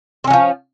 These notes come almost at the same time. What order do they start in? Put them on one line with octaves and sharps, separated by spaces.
C4 C#4 F#3 F3